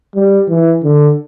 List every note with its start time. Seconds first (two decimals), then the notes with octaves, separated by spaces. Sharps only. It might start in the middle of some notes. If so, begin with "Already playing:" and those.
0.16 G3
0.49 E3
0.84 D3